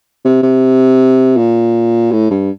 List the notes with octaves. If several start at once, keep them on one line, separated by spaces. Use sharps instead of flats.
C3
C3
A#2
A2
G2